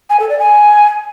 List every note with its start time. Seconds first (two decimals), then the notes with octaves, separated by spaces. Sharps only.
0.10 G#5
0.19 A4
0.29 D5
0.39 G#5